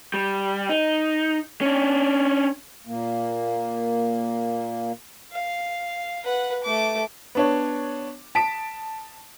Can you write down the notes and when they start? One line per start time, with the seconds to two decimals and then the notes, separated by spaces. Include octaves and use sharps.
0.14 G3
0.69 D#4
1.61 C#4 D4
2.87 A#2 A#3
5.32 F5
6.24 B4 F#5
6.64 A3 D6
7.35 B3 D4 C#5
8.35 A5 B6 D7